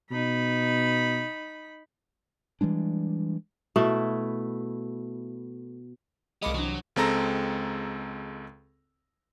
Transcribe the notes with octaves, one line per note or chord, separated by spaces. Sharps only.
B2 D#4 B5
E3 G3 G#3 D4
B2 A3 E4
C2 G#3 A#3 D#5 B5 D6 D#6 C#7
E3 F#3 D4
C#2 G#3 C4 A4 A#5 A#6